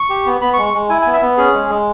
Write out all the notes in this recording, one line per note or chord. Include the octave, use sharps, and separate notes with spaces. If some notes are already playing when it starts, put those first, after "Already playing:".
Already playing: C#6
G4
B3
B3 B5
C#6
G#3
C#6
G#3
E4 G#5
G#5
B3
E5
B3
C#4 G#4
G#3
G#3